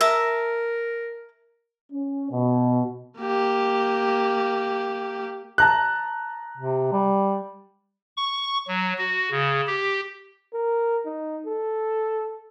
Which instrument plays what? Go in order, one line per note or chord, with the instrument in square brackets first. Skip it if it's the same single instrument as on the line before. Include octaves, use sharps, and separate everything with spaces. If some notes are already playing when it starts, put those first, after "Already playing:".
[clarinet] A#4 [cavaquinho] E5 A5 A#5
[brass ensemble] C#4
B2
[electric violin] A#3 G4
[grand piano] A5 A#5 F#6
[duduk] C3
G3
[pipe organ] C#6
F#3
F#4
C#3
G4
[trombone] A#4
D#4
A4